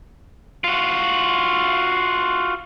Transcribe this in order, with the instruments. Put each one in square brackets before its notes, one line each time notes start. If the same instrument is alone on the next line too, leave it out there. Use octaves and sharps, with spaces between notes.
[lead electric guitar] F4 F#4